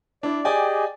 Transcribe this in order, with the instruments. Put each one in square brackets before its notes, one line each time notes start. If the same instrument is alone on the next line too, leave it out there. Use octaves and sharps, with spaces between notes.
[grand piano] D4 E4 [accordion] D5
[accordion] G4 G#4 D#5 [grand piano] D5 G5 G#5